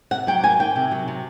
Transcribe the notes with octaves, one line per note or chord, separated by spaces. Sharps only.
C3 F#5
F#3 G5
A#3 G#5
D#3 G5
C3
F#3
C3